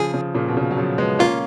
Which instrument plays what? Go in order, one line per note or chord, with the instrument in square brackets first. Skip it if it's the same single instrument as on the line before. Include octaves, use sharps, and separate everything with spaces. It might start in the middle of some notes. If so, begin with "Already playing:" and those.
Already playing: [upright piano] C#3 F3 [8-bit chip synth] G#4
[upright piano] C#3 F3
A#2 C#3
B2
A#2 C#3
F#3
C#3 F3
G#3 B3
[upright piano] A#3 C#4 [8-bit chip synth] F4